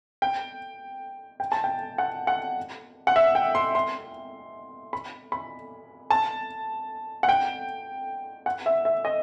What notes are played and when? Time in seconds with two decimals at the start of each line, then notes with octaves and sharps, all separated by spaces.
0.22 G5
1.40 G5
1.52 A5
1.64 G5
1.98 F#5
2.27 F#5
3.07 F#5
3.16 E5
3.35 G5
3.55 C6
3.75 C6
4.93 B5
5.32 B5
6.10 A5
7.23 F#5
7.29 G5
8.46 F#5
8.66 E5
8.85 E5
9.05 D#5